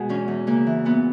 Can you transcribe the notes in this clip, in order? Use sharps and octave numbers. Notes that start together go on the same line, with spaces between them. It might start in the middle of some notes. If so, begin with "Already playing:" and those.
Already playing: B2 G#3 F#4 G#4
E2 C#4
E2
C#3 A#3
E3
A#2 B3